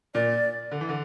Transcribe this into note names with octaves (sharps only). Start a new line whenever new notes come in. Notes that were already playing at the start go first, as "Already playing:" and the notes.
A#2 D5
D3
E3
D3